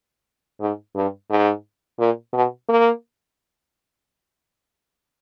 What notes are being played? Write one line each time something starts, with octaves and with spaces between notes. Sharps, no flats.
G#2
G2
G#2
A#2
B2
A#3